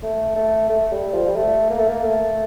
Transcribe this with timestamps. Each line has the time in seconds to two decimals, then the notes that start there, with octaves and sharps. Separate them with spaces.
0.02 A3
0.36 A3
0.69 A3
0.92 G3
1.14 F3
1.27 G3
1.36 A3
1.70 A#3
1.78 A3
1.88 A#3
2.04 A3